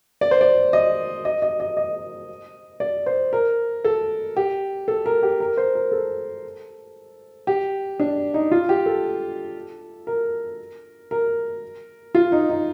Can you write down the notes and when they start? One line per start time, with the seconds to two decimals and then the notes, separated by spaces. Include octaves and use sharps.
0.21 D5
0.31 C5
0.41 D5
0.73 D#5
1.25 D#5
1.42 D#5
1.60 D#5
1.77 D#5
2.80 D5
3.06 C5
3.33 A#4
3.85 A4
4.37 G4
4.88 A4
5.06 A#4
5.23 G4
5.40 A#4
5.57 C5
5.75 A#4
5.92 A4
7.47 G4
8.00 D4
8.34 D#4
8.52 F4
8.69 G4
8.86 A4
10.07 A#4
11.11 A#4
12.15 F4
12.32 D#4
12.49 D#4